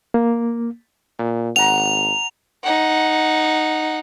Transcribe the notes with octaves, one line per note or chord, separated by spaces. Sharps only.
A#3
A#2
G#1 F#5 A#5 F7
D#4 F#5